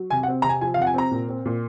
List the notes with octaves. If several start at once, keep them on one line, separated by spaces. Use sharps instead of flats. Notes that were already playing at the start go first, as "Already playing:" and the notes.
Already playing: F#3
C3 G#5
F#5
C4
C3 A#5
G#5
F3 G#5
F5
C3 F#5
G#5
C4 A#5
A#2
C4
A#2